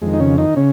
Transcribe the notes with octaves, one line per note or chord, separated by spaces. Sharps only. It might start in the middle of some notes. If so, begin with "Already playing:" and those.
F2 D#3 G#3
D#4
C#3 C#4
D#3 D#4
C#3 C#4